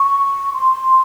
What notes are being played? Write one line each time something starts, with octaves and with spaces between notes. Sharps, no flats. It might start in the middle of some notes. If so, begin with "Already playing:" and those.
Already playing: C#6
C6